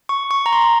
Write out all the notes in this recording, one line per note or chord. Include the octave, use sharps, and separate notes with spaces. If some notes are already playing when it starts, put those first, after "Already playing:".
C#6
C#6
A#5
C6